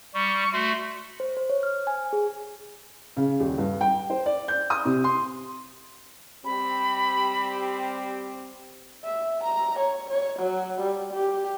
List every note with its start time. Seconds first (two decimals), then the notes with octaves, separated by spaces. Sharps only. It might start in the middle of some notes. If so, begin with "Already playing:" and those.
0.14 G3 C#6
0.53 A3 F#4 C6
1.20 C5
1.37 C5
1.50 C#5
1.63 F6
1.87 G#5
2.13 G#4
3.17 C#3
3.40 D#1
3.58 G2
3.81 G5
4.10 C5
4.26 D5
4.48 G6
4.70 D#6
4.85 C3
5.04 C6
6.45 G3 C4 G4 B5
9.04 E5
9.43 A#5
9.79 C#5
10.10 C#5
10.39 F#3
10.80 G3
11.13 G4